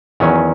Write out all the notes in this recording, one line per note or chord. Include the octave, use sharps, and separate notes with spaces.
E2 D#3 F#3 C#4